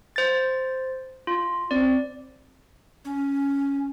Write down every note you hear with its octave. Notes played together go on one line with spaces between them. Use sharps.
C5 A6
F4
C4 D5
C#4